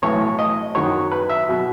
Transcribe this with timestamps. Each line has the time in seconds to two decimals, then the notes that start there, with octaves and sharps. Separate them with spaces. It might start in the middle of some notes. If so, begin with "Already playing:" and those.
0.02 B1 A2 E3 C#5
0.39 D#5
0.75 F#2 D#3 F#3 C#5
1.12 B4
1.29 E5
1.48 B2 F#3